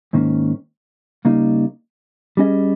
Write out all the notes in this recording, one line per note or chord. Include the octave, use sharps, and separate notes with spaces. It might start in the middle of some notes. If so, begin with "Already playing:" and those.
G#2 D#3 A#3 C#4
C#3 G3 A#3 D#4
G3 C#4 G#4 D#5